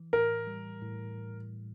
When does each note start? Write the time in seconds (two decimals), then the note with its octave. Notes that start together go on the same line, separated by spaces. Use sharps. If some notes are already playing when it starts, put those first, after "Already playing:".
Already playing: E3
0.13 A2 A#4
0.47 G3
0.81 A2